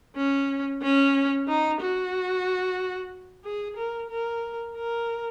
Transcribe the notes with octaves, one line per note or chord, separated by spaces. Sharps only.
C#4
C#4
D#4
F#4
G#4
A#4
A#4
A#4